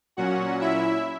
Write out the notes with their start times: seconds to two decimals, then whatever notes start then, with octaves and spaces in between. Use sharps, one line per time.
0.17 A#2 F#3 C#4 F#4 F#5
0.61 E4 E5